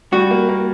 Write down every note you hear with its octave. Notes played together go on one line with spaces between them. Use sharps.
G3 F#4
A#3
A#3